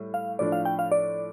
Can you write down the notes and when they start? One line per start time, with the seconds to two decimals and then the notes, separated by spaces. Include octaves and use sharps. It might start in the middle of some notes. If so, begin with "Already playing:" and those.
Already playing: A2 G3
0.14 F5
0.39 A2 F3 D4 D5
0.52 F5
0.65 G5
0.79 F5
0.92 D5